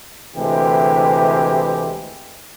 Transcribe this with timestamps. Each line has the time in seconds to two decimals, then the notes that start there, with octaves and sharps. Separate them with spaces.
0.36 D2 C3 E3 G#3 E4 G4